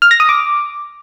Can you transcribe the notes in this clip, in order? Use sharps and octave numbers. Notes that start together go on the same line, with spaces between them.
F6
A#6
D#6
D6